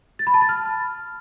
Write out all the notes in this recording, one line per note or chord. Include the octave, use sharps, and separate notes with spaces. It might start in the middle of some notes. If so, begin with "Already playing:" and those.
A6
B5
A5
A6
F6